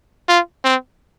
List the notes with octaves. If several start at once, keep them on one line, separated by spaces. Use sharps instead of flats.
F4
C4